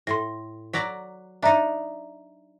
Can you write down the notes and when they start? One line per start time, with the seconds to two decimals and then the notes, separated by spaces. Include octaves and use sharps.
0.07 A2 C6 A#6
0.73 F#3 D5 A#5 B6
1.42 D4 D#4 D5 E5 A#5